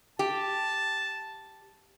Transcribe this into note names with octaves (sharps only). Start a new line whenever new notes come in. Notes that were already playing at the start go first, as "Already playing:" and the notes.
G4 A5